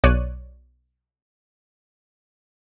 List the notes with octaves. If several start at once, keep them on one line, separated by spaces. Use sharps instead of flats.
B1 C#5 D5 F#6 D#7